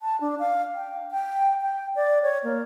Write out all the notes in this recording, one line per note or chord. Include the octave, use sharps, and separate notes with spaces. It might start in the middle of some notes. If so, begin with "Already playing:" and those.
A5
D4
F5
G5
G5
G5
D5
C#5
A#3